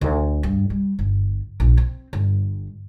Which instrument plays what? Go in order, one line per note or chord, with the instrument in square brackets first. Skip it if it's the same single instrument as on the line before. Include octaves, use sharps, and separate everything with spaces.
[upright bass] D2
G2
G3
G1
A#1
C4
G1